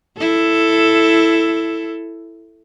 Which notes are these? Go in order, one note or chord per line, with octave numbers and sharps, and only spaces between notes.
E4 A4